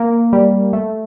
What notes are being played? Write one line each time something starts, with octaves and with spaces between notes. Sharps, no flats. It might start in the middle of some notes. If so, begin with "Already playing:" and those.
Already playing: A#3
G3
A3